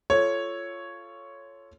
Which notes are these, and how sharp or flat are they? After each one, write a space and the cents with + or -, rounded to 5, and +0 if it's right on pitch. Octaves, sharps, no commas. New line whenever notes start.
F4 -15 A4 +0 C#5 +0